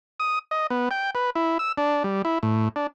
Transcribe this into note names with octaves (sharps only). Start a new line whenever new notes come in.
D#6
D#5
B3
G5
B4
E4
E6
D4
G3
E4
A2
D4